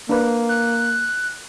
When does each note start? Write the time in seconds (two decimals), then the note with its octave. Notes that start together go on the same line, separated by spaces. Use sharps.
0.09 A#3 D4 B4
0.49 F#6